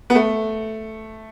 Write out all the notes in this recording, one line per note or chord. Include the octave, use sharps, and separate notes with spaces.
B3
A3